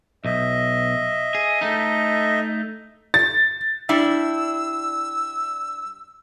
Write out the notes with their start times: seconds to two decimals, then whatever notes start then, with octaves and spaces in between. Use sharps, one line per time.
0.25 B1 D#5 E5
1.35 G#4
1.61 A3 D#4
3.14 A6
3.89 G3 D4 E4 E6